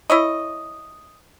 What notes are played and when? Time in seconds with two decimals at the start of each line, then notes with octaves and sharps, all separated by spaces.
0.10 E4 C#5 D#5